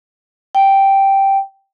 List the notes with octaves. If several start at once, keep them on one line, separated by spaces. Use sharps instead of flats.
G5